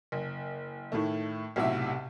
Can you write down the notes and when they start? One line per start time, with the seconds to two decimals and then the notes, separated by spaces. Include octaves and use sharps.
0.12 F#1
0.92 A2 D#3 A3
1.56 B1 A2 C3 F#4 E5